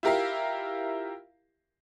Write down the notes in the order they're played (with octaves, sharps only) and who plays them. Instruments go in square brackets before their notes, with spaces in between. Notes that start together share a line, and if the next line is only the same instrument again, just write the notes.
[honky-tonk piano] E4 F4 G4 A#4 E5 F5